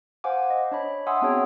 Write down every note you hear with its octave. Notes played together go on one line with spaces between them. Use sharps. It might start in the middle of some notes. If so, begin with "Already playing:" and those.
C5 F5 F#5 G#5 D6
D#5
D4 C#5 B5
E5 F#5 G#5 C6 D#6 E6
B3 C4 D4 F#4 G#4 C#5